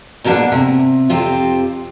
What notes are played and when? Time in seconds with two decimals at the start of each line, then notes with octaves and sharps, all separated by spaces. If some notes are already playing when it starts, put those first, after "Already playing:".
0.24 G#2 B2 D#3 A#3 D4 F#5
0.52 C3
1.10 F2 C3 C4 F4